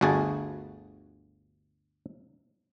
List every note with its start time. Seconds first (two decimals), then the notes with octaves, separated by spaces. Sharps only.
0.01 G1 D2 F#4 G#4 A5